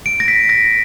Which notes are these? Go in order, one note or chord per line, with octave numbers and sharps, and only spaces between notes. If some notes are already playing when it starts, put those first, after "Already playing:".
D7
A#6
B6
A#6